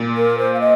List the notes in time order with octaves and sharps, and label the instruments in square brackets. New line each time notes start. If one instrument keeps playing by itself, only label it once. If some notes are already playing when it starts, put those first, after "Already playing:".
Already playing: [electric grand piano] A#2
[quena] A#4
C5
F5
D#5